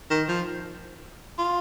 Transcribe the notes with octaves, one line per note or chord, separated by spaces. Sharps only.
D#3
F3
F4